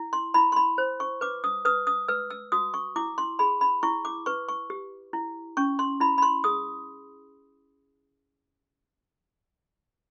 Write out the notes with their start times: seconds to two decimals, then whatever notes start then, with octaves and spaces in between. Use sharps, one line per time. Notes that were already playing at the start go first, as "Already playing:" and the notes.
Already playing: E4
0.13 C6
0.34 E4 B5
0.52 C6
0.56 B5
0.78 C5
1.00 C#6
1.21 B4 D6
1.44 D#6
1.65 B4 D#6
1.87 D#6
2.08 B4 E6
2.30 E6
2.52 F#4 D#6
2.74 C#6
2.96 E4 D6
3.18 C6
3.39 G#4 B5
3.61 B5
3.83 E4 C#6
4.05 D6
4.26 B4 C#6
4.49 C#6
4.70 G4
5.13 E4
5.57 C#4 C#6
5.79 C6
6.00 E4 B5
6.18 B5
6.22 C6
6.44 G#4 D#6